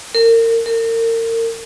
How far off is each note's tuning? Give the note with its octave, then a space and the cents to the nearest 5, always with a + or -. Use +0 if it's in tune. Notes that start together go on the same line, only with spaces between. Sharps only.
A#4 -30
A#4 -35